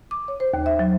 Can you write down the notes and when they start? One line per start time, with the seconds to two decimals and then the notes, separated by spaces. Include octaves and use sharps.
0.11 D6
0.28 C#5
0.40 C5
0.54 D#2
0.66 E5
0.79 F#3